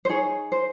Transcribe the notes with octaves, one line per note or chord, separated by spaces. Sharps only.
C5
D#4 G#4 C#5
C5